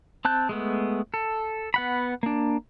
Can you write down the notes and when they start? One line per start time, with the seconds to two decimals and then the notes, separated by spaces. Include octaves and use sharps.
0.25 C4 A5 F#6 G6
0.49 G#3 A3 B3
1.14 A4
1.74 B3 F#5 B5
2.23 A#3 D4